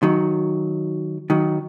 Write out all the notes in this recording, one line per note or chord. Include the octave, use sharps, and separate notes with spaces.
D#3 F#3
D#3 F#3